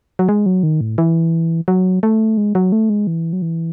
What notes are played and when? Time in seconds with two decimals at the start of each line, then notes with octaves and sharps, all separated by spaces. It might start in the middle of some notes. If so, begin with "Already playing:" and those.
0.19 F#3
0.29 G#3
0.46 F#3
0.63 D#3
0.81 A2
0.98 E3
1.68 F#3
2.03 A3
2.37 G#3
2.55 F#3
2.72 A3
2.90 G#3
3.07 E3
3.33 F#3
3.42 E3